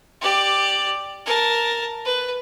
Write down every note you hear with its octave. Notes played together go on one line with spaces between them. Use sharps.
G4 D5
A#4 A5
B4